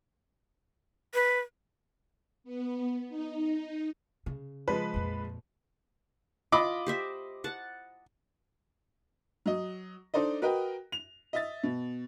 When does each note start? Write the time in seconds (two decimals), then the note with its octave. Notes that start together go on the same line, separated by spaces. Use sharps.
1.14 B4
2.44 B3
3.08 D#4
4.26 C#3
4.68 F3 G#3 B4
4.94 A#1 F2
6.52 F4 D#5 B5 D6
6.86 G4 C5 E5
7.44 F#5 A5
9.46 F#3 D#5
10.14 D4 D#4 A4 C5 D5 D#5
10.42 F#4 A#4 B4 D#5 G5
10.92 F7
11.33 D#5 E5 A6
11.63 B2